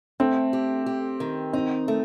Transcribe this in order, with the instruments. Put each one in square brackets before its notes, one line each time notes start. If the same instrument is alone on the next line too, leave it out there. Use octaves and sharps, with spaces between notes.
[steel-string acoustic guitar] A3 [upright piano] C4
[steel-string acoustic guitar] G4
G4
D#3
[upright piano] C4 [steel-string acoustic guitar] D#4
[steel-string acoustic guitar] A3